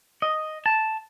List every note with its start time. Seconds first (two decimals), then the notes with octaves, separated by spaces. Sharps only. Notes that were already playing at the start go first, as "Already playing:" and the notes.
0.22 D#5
0.66 A5